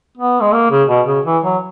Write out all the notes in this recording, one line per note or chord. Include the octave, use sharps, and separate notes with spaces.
B3
G#3
A#3
C#3
B2
C#3
E3
F#3